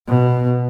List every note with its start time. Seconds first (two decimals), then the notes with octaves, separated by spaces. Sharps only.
0.08 B2